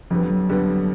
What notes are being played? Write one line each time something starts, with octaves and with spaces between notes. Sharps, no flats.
F2 D3 F3 G3 B3
F#3
F2 D3 G3 B3